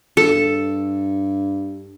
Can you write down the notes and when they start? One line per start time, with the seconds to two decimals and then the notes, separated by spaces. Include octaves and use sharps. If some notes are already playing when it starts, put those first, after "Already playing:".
0.17 G2 A4